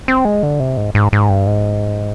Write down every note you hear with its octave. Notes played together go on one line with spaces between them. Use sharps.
C4
G#3
D3
C3
G#2
G#2
G#2
G2
G#2